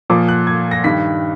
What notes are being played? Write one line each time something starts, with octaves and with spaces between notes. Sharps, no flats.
A#2 F3 D6
F#6
G#6
A#6
G2 D#3 B6